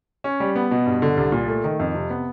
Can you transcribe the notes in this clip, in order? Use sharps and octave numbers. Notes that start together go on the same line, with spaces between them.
C#4
G3
B3
B2
G2
D3
C2
A#2
A3
D#3
F2
C3
B3